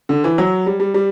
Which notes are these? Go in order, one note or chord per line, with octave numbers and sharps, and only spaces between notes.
D3
E3
F#3
G3
G3
G3